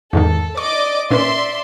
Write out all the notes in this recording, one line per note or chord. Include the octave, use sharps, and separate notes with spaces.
E2 G#2 D#3 A4
D5 D#5 C#6 D6
A#2 C#4 B4 D5 E5 C6